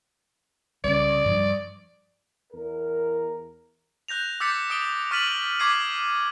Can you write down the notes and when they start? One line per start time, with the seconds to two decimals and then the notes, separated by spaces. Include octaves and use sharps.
0.84 C2 C#3 D5
1.26 G2 F3 G3
2.53 E2 A#4
4.08 F#6 G6 A#6 F7
4.40 D6 E6 G6 A6 B6 C#7
4.70 D#6 D7 G7
5.11 C#6 F6 A6 B6 D#7 F#7
5.59 C#6 D6 G#6 B6 C7 D#7